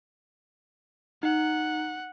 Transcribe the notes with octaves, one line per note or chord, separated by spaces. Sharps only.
D#4 F#5